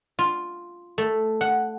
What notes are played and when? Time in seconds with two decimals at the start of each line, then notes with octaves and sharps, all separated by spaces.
0.19 F4
0.98 A3
1.41 F#5